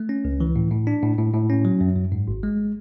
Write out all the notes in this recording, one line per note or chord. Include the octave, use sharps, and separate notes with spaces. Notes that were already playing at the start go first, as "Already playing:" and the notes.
Already playing: A3
C#4
C#2
E3
A2
A2
D4
A2
A2
A2
C#4
F#3
F#2
F#2
G#2
G#1
G#3